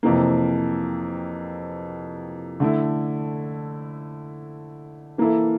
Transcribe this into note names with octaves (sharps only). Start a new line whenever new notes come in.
F2 C3 E3 A#3
D3 A3 E4
E3 A#3 E4 A4